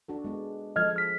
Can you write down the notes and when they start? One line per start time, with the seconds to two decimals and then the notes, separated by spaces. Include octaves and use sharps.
0.08 D4 F#4 A4
0.24 G#3 B3
0.76 F3 G#3 A4 D#5 F6 G#6
0.96 F6 B6